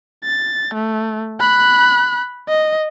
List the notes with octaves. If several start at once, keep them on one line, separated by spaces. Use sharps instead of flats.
A6
A3
B5 F#6
D#5